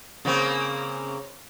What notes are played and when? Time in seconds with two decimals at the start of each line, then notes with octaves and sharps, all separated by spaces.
0.25 C#3 A#3 C4